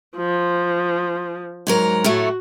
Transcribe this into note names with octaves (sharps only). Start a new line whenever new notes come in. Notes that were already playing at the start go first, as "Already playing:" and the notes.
F3
G#2 F#3 A#4
A2 F#3 A3 F#4